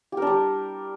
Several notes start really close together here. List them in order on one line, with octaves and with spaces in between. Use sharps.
G4 A#4 D4 G3